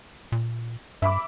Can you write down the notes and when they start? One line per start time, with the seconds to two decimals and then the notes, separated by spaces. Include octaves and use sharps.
0.32 A#2
1.02 G2 E5 B5 D6